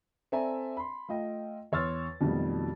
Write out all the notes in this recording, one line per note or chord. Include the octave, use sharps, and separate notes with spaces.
C4 A4 D5 E5 G#5 A#5
B5 C6
A3 F4 D#5 G5
E2 C#5 C6 E6 F6 A6
F2 B2 D#3 F#3 G3 A3